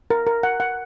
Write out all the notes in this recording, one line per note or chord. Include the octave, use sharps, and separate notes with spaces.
A#4
A#4
F#5
F#5